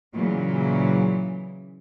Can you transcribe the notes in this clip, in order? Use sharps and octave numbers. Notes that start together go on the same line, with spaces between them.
A#2 C#3 E3 F#3